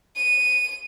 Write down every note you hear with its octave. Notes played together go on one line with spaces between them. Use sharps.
D#7